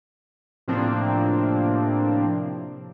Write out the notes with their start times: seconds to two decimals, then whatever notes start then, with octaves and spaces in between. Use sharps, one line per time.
0.68 A2 C3 F3 A#3 C4 D4